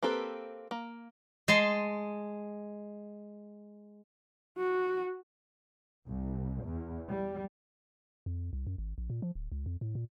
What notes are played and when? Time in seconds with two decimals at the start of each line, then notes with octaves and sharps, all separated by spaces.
0.03 A#3 C4 G4 A4 B4
0.71 A#3
1.48 G#3 A5 C6
4.58 F#4
6.08 C2
6.65 E2
7.11 G3
8.26 F2
8.53 C2
8.67 F#2
8.78 G#1
8.98 A#1
9.10 A#2
9.22 F3
9.35 D1
9.52 C#2
9.66 F2
9.81 A2
9.95 A#2